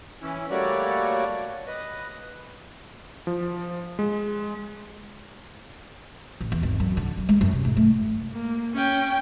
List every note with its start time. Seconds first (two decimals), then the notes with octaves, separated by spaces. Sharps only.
0.22 E3 C#4 E4
0.50 G3 A3 A#3 F#4 C#5 D5
1.67 B4 D#5
3.27 F3
3.99 G#3
6.41 A1
6.52 E2
6.63 G#1
6.80 F#2
6.97 D3
7.17 F#2
7.29 G#3
7.41 F#2
7.53 C3
7.65 G#2
7.77 A3
8.32 A#3
8.74 C#4 G5